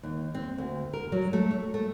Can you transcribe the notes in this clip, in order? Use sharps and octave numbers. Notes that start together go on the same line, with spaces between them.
D#2
C4
D2
A#4
F#3
A3
C#5
A3